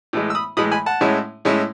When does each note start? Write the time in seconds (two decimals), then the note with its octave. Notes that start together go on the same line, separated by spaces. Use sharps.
0.13 A2 E3 G#3
0.30 E6
0.35 B5 D#6
0.57 A2 E3 G#3 B5 D#6
0.72 G#5 B5
0.86 F#5 A5
1.01 A2 G#3 C#4 E4
1.45 A2 G#3 C#4 E4